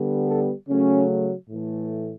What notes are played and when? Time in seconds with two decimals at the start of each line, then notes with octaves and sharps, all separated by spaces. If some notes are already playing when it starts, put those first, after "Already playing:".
Already playing: D3 G3 B3
0.28 A4
0.69 C#3 F#3 A3 C#4
1.50 A2 E3 A3